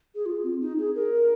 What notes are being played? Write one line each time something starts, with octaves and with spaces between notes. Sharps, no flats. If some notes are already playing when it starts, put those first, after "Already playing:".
G#4
F4
C4
D#4
G#4
A#4